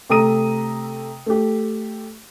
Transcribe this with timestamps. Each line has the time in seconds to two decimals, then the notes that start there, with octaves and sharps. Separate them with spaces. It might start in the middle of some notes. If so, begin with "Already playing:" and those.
0.09 C3 A3 A#5 D#6 D#7
1.26 A3 G4